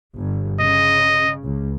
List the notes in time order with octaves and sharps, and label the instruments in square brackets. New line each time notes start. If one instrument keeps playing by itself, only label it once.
[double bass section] G1
[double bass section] C#3 [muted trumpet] D#5
[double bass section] C#2